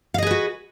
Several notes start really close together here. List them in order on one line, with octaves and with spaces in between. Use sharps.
F5 D#5 G#4 B4 F#4